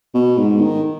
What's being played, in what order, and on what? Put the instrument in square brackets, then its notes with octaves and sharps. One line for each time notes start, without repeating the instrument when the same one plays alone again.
[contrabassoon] B2
G#2
D#3